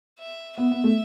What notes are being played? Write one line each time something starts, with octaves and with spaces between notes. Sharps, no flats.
E5
B3 E5
B3
A3